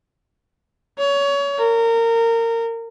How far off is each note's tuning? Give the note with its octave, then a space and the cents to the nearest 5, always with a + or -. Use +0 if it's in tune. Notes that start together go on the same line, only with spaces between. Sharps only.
C#5 +25
A#4 -25